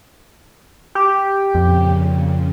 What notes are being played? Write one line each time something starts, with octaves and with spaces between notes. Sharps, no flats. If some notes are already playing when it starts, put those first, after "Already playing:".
G4
F2 A#2 C#3